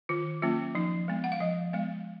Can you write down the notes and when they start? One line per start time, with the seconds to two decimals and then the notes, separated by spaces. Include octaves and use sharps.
0.09 D#3 F4
0.42 F#3 A#3 C#4 F4
0.75 F3 D#4
1.08 G#3 B3
1.24 F#5
1.32 F5
1.40 F3 D#5
1.73 G#3 B3 F5